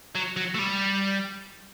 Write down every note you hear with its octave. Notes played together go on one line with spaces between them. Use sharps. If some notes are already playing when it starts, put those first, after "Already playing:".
F#3
F#3
A3
G3